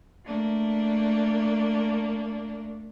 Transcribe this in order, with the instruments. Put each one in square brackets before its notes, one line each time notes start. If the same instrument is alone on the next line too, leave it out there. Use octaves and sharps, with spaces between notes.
[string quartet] A3 A#3 D4